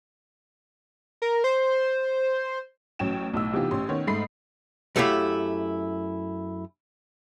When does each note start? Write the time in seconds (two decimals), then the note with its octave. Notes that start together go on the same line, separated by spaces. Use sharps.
1.22 A#4
1.44 C5
2.99 A1 F#3 C#4 G5 E7
3.33 B1 A2 E6
3.53 C3 E3 B3 D#4 F4 G4
3.71 A1 C#4 G4 C6
3.89 D#3 B3 C#4 C#5
4.07 G#2 A3 B5 C7
4.96 F#2 A3 B3 E4 G4 F5